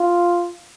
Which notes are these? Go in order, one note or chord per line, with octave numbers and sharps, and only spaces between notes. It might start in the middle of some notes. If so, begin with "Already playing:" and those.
Already playing: F4